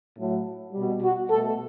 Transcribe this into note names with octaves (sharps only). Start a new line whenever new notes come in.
A2 F#3 A3
B2 G3
F#4
B2 A3 A4